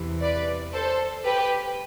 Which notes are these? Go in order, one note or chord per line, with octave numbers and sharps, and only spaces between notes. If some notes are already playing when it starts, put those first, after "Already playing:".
Already playing: E2 C3 E3
B4 D5
A4 C5
G4 B4